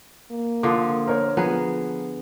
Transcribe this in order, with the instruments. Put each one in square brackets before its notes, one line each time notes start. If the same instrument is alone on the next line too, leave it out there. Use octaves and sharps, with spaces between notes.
[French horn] A#3
[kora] D3 F3 [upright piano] D6 D#6
[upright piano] A#4 C5 C#5
[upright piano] F3 A#5 [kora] B3 G#4